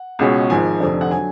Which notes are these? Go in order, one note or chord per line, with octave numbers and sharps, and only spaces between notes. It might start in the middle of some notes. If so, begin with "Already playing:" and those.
Already playing: F#5
C#2 B2 G#3 C#4
G#1 G#2 F3 G#5
F1 F2 D3
F#5
D3 F#3 G#5